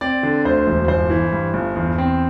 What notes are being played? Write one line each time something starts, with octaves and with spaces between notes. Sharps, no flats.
C4 D5
D3
D2 C5
E1
G1 C5
E3
G2
G1
E2
C4